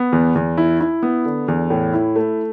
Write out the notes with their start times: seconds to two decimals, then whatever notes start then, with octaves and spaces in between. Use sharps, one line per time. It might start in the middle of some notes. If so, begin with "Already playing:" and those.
Already playing: B3
0.13 E2
0.35 E2
0.58 E4
0.80 E4
1.03 B3
1.25 D3
1.48 E2
1.70 A2
1.93 E4
2.16 A3